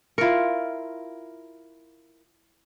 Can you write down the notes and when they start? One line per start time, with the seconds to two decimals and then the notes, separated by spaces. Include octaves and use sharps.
0.18 E4 F4 A#4 C#6